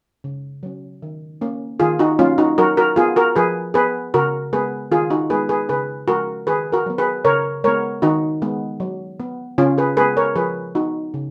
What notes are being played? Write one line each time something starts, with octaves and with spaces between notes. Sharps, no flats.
C#3
F#3 C#4
D#3
A#3 C#4
D#3 F4 G#4
D#4 F#4
F#3 A#3 C#4 F4
D#4 F#4
F#3 F#4 A#4
F#4 A#4
B3 F4 G#4
F#4 A#4
F3 G#4 B4
B3 G#4 B4
C#3 F#4 A#4
G#3 B3 G#4 B4
D#3 F4 G#4
D#4 F#4
G#3 B3 G#4 B4
G#4 B4
C#3 G#4 B4
F3 G#3 C#4 F#4 A#4
D#3 G#4 B4
F#4 A#4
F#3 B3
G#4 B4
C#3 A#4 C#5
G#3 B3 A#4 C#5
D#3 D#4 F#4
G#3 B3
F#3
B3
C#3 C#4 F4
G#4 B4
G#3 B3 G#4 B4
A#4 C#5
F3 G#4 B4
B3 D#4 F#4
C#3